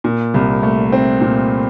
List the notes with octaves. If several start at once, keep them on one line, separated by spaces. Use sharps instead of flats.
A#2
C2
A3
C4
A#2